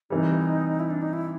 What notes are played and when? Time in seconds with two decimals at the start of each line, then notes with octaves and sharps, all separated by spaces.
0.10 C3 E3 G3 D#4
0.80 E4
0.90 D4
1.02 D#4
1.13 E4